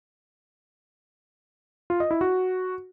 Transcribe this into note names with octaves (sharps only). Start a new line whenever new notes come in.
F4
D#5
E4
F#4